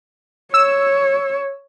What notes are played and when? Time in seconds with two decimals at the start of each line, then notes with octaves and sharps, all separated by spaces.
0.54 C#5 E6